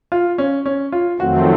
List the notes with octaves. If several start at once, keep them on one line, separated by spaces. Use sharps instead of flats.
F4
C#4
C#4
F4
F2 D#3 F#3 A3 C4 F#4